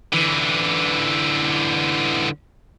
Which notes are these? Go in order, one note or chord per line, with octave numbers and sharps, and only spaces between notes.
D3 E3